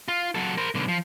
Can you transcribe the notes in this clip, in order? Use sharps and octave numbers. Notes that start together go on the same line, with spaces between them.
F4
F#3 A4
A#4 C5
B1 D3
F3